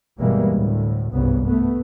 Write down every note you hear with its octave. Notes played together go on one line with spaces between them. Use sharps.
G1 B2 E3 G3 G#3 A#3
D2 A2
G1 C2 G#2 C#3 B3
A3 B3